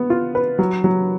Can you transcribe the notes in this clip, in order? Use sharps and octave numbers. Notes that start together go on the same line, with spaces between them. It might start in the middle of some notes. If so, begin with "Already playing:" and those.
Already playing: B3
F4
B4
F#3
F#3